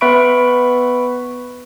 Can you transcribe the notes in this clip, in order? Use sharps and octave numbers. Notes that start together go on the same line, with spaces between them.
B3 B4 E5 B5 C#6 D7